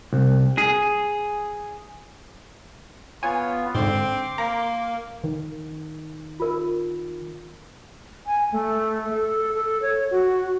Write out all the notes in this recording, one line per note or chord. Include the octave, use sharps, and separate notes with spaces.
C2
G#4
B3 F4 C#5 G#5
G#2 D3 C4 C6 D6
A#3 A#5
D#3
F4 A#4
G#5
A3
A4
A4
C#5
F#4